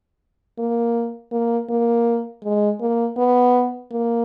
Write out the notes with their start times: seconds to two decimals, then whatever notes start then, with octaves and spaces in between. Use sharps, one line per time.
0.58 A#3
1.32 A#3
1.69 A#3
2.44 G#3
2.81 A#3
3.18 B3
3.91 A#3